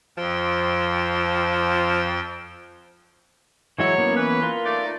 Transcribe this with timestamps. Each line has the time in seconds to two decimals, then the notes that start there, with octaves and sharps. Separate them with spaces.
0.17 F2 F3 G5 C6
3.79 E3 F#3 G#3 E4 C#5
3.98 A#3 B3 C#4
4.16 E3 B4
4.42 F4 A#4 C6
4.64 A3 D#4 D5